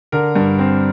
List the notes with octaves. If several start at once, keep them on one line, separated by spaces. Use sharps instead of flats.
D3 A#4
G2
C4